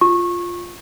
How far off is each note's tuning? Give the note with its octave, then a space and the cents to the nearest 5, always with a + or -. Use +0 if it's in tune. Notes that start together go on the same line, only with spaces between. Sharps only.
F4 +0 C#6 -20